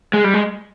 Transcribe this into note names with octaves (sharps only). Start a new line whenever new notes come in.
G#3
G3
G#3